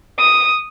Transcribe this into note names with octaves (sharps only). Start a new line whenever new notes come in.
D#6